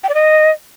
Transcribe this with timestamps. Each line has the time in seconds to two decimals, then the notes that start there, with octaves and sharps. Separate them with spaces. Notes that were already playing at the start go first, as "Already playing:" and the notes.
0.04 G5
0.09 D5
0.14 D#5